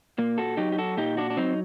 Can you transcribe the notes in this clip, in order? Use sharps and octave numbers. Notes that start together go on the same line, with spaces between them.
A#2 A#3
F#4 A4
F#3 D#4 G4
G4
F#4 A4
A#2 D#4 G4
D4 F#4
D4
F#3 C4 D#4